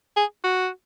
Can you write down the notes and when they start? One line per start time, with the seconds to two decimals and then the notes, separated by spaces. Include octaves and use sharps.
0.17 G#4
0.44 F#4